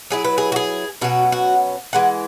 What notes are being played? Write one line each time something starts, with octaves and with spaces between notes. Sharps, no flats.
F#3 E4 G#4
B4
G#4
F#4
G#4
B2 F#3 C#4 F#4
F#4
E3 G#3 F#5